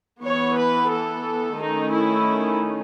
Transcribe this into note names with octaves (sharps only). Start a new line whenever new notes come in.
E3 B3 C#5
B4
A4
D#3 A3 C#4 D#4
E4